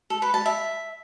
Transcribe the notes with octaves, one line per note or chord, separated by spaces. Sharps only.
A4
B4
A5
E5